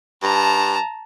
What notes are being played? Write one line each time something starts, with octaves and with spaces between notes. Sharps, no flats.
G2 A5 A#5